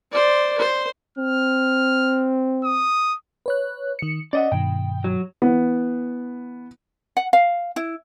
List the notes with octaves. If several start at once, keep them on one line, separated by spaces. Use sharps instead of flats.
C5 D5
C5
C4 F6
D#6
B4 C#5 F#6
D#3 C#7
C#4 D5 D#5 F#5
G2 B2 D#3 G5
F#3
E3 B3
F#5
F5
E4